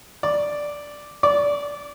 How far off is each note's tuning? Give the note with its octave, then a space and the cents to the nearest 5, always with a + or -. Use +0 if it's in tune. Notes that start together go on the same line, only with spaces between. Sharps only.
D5 +0
D5 -20